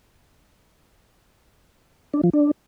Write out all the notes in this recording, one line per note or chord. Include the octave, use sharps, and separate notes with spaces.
D4
F3
D4